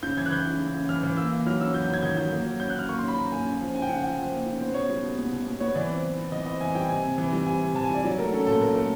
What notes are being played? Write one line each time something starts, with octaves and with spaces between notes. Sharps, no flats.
C#3 G6
E3 G#6
F#6
E3 G6
C#3
C#3
C#3
E3 F6
E3
A#3 E6
A#3
F#3 F6
C#4 E6
F#3 G6
G6
C#4 G#6
D#3 G6
F#3 G6
A#3
F#3
C#4 G6
F#6
C#4 F6
A#3 C#6
C6
C#4 B5
C#4 A#5
A#3 G#5
C#3
F3
C#3 G#5
G5
C#3 F#5
G5
F3 F#5
F3
A#3
C#3
B3 C5
B2 C#5
G3
B2
B3
B2
B2
B3 C#5
E3 D5
C4
E3
C4
E3 D#5
C4 D#5
E3 G#5
G3 G5
C3 G#5
C3
E3
G3
C3 G#5
C3
E3 A5
G#5
G3 D5
F#3 D5
A3 A#4
C#4 A4
A#2 A4
A#2 A#4
A3 A#4